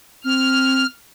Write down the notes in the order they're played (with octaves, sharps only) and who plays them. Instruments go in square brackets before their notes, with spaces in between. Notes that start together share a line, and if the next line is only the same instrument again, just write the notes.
[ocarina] C4 [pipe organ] F6